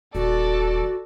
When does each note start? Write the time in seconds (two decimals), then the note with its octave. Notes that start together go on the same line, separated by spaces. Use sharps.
0.15 D#1 F#4 A4 D5